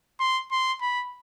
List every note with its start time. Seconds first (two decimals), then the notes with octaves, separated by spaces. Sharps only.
0.20 C6
0.51 C6
0.81 B5